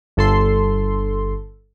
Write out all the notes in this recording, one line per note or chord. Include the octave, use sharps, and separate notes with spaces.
G1 A4 C6